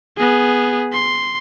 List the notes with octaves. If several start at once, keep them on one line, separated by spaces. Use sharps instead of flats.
B3 G#4
C6